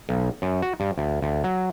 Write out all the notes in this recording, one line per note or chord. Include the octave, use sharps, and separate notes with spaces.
B1
F#2
F#4
G2
D2
D2
F#3